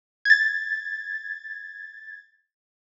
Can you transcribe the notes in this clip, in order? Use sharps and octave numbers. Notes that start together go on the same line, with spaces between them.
G#6 A6